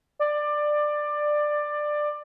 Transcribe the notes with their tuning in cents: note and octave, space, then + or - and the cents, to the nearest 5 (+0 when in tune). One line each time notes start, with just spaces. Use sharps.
D5 +15